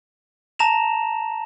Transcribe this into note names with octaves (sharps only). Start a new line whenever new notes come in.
A5 A#5 A#6 E7 F7